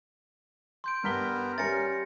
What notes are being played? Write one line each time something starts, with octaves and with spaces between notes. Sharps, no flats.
C6 G6 D7
G2 B3 A#4 B6 G7
G3 C#4 A#4 E5 A6 A#6 C#7